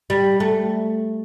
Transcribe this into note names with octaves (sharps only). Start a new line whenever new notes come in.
G3
A3